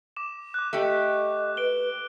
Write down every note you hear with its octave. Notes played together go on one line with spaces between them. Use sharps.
D6 E7
D6 F#6
A3 G4 D#5
B4 D7 G7